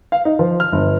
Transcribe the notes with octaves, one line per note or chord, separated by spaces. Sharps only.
F5
D#4
F3
F6
G1